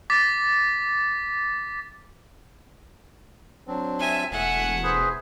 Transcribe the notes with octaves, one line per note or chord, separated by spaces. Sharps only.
D6 A6 B6
F#3 C4 D4
F4 E5 G#5
E1 A3 E5 F#5 G#5
G#4 B4 C5